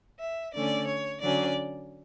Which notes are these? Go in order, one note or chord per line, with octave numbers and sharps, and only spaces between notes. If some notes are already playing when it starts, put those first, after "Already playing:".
E5
D3 A3 C#4 D5
C#5
D3 F#3 C#4 D5